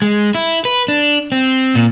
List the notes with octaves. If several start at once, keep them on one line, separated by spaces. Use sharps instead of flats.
G#3
E4
B4
D4
C4
A#2